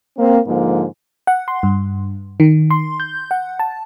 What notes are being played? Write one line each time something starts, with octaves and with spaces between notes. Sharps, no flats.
A#3 C4
G#2 D3 F3 A#3
F#5
C6
G2
D#3
C6
G6
F#5
A5